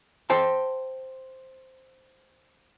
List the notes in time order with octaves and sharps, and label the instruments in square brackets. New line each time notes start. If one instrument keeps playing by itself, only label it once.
[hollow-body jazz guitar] C5 G5 A5